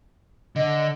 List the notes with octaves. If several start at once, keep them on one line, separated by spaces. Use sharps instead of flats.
D3 D#5